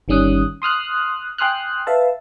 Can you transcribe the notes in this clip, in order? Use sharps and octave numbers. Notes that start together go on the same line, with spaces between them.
G1 D#3 G3 C#4 D#6 F#6
C6 D#6 F6 F#6
G5 G#5 C6 D#6 F6 F#6
B4 E5 F5 A5